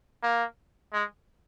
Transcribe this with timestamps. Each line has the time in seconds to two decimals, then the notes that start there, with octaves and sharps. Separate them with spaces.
0.23 A#3
0.93 G#3